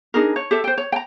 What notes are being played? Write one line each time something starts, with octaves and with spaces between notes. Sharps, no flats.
D4 D#4 G#4 A#4
C#5
G4 A4 E5
C5 G5
C#5
G5 A#5